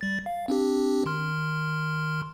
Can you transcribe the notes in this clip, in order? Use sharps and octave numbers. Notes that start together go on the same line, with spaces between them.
G3 A6
F5
C4 D4 G4
D#3 C6 F6